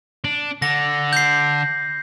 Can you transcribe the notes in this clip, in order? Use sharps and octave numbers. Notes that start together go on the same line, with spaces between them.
D4
D3 A#6
G6 C7